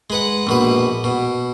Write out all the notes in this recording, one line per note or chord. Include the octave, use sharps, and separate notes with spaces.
G#3 B4 F#5
A#1 B2 B4
B2